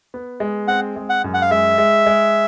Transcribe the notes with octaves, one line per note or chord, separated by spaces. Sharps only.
B3
G#3
C4 F#5
G#3
F#5
F#2
F#5
F5
G#3 E5
G#3
G#3